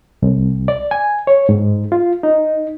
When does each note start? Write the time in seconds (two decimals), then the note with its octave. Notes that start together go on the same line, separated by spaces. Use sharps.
0.22 C2
0.68 D5
0.91 G#5
1.27 C#5
1.49 G#2
1.92 F4
2.23 D#4